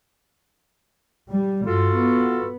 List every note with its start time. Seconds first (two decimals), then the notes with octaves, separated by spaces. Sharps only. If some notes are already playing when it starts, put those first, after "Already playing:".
1.30 G3
1.66 G2 F4 F#4 A4
1.94 B3